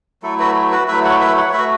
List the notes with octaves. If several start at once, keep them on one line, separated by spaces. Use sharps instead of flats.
F#3 A3 E4 A4
F#4 B4
F#4 B4
F#3 A3 E4 B4 E5
C#5 F#5
B4 E5
C#5 F#5
C#5
A3 F#4 B4 E5